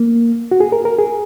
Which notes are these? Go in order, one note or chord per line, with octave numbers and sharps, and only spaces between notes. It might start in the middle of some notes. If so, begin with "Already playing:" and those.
Already playing: A#3
F#4
G#4
A#4
A#4
G#4